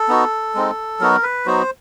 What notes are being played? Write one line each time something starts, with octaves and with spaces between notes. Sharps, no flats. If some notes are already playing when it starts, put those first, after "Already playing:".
Already playing: A4
B3 D#4 F#4
G#3 C4 D#4
F#3 B3 D#4 F#4 A#4
B4
F#3 B3 D#4 F#4 C5